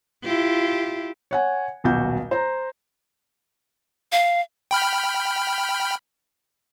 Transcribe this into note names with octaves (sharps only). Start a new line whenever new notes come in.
E4 F4 G4
C#5 F#5 G#5
D#1 B1 F#4 G6
C5 A#5
F5
G5 B5 F6